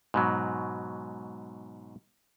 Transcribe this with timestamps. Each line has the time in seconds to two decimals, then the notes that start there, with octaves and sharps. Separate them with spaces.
0.14 G#2 B2 F#3